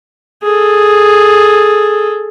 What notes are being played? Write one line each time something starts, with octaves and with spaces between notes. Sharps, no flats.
G#4 A4